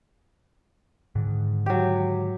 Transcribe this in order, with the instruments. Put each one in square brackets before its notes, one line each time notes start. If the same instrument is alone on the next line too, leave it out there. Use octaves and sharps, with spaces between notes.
[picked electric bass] G#2 D3 D#3
[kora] F#3 G4